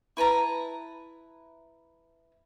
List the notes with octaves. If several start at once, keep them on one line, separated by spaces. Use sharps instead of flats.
E4 B4 A5 A#5